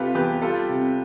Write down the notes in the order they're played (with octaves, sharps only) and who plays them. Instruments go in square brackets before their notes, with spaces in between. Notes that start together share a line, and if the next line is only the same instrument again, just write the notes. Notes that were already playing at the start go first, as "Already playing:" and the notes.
Already playing: [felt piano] C3 G3 [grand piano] F4 G4 A4 B4
[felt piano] E2 [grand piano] G4 B4
[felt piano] G3 [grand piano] F4 A4
[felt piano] C3